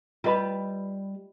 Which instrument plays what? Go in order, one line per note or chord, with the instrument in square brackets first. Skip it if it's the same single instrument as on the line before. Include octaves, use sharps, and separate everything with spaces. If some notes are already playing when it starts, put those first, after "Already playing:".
[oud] G3 B4 [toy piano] F4 D#5 B5